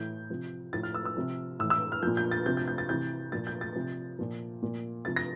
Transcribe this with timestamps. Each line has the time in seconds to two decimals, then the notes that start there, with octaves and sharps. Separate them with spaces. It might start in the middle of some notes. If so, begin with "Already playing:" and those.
Already playing: A2 E3 G6
0.30 C3 F3
0.73 A2 F3 A6
0.83 F6
0.94 E6
1.05 E6
1.17 C3 F3
1.59 A2 E6
1.63 E3
1.70 E6
1.92 F6
2.03 A#2 F3 G6
2.17 G6
2.31 A6
2.46 C3 F3 G6
2.57 G6
2.68 G6
2.78 A6
2.89 C3 E3 G6
3.32 A#2 F3 A6
3.47 G6
3.61 A6
3.76 C3 F3
4.19 A#2 F3
4.62 A#2 F3
5.05 C3 F3 A6
5.16 A#6